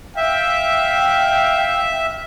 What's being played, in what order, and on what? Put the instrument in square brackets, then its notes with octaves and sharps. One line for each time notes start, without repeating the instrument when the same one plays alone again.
[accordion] E5 [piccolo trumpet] F5 [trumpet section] G5